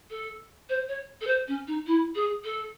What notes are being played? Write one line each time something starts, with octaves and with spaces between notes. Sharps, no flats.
A4
C5
C#5
A4
C5
C#4
D#4
E4
G#4
A4